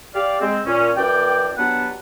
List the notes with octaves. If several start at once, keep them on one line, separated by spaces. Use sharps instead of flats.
G4 D5 F5
G#3 C4
A#2 C#4
F#2 E3 D5 G5
F#3 G3 B3 D4 B4 F#5